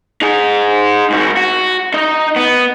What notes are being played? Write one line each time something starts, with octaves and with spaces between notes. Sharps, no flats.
D#4 G#4
G#2 F#4
F#4
D#4 D#5
B3